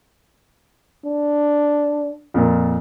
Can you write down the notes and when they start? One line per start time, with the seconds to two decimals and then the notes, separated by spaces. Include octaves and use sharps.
1.05 D4
2.34 F2 A#2 A#4